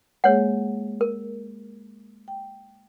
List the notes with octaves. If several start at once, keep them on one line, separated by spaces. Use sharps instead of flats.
G#3 A#3 G#4 C#5 F#5
A#4
G5